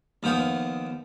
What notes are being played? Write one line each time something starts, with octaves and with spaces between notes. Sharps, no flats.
D#2 F3 B3 G5 D#6